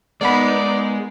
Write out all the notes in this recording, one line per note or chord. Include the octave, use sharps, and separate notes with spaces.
G#3 A#3 B3 D#4 D5 F#5 B5